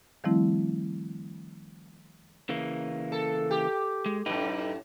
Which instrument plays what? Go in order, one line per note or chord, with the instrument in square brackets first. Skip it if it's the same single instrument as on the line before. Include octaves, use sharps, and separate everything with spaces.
[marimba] D#3 F3 G3 A3 C4 E4
[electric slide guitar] C#3 E3 A#3
[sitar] A4
G4
[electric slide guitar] G#3
[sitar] F#2 A2 [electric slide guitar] D#4 G4 B4